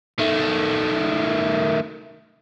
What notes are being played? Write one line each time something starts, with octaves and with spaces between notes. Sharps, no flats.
D#3 A3